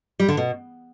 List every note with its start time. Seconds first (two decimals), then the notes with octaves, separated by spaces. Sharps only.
0.20 G3
0.28 D3
0.37 B2